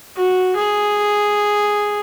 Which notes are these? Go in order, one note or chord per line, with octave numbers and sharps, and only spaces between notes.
F#4
G#4